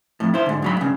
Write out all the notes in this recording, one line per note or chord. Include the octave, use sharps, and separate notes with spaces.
F2 A2
E4 C5
G#2 D3
G#2 F#3 B5
G2 C#3